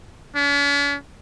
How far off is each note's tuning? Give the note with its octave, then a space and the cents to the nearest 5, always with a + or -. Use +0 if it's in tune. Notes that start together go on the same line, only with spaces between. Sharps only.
C#4 +45